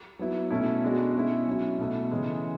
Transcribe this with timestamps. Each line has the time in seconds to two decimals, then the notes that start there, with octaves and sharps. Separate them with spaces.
0.19 F#3 B3 E4
0.51 B2 A3 C#4 E4
0.83 B2 G#3 D4 F#4
1.14 B2 G#3 C#4 E4
1.47 F#3 C#4 E4
1.79 B2 A3 E4
2.11 C#3 E3 G#3